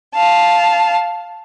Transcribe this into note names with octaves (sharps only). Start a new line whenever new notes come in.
F5 A5